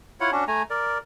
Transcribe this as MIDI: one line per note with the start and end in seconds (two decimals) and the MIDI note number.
0.21 0.30 64
0.21 0.30 65
0.21 0.30 73
0.21 0.30 78
0.32 0.44 61
0.32 0.44 62
0.32 0.44 66
0.48 0.62 57
0.48 0.62 80
0.48 0.62 82
0.70 0.98 70
0.70 0.98 74